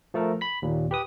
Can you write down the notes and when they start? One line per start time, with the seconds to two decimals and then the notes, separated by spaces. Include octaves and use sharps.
0.14 F3 A3 A4 A#4
0.41 B5 B6
0.62 D#2 A#2
0.91 G4 B4 D#6